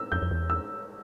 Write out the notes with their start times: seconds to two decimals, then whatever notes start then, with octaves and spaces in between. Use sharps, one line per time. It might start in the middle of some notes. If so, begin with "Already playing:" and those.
Already playing: E6
0.12 F2 G6
0.22 F2
0.31 E2
0.50 E6